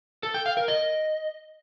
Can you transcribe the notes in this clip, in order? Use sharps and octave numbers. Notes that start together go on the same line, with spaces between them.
A4
G5
F5
A#4
D#5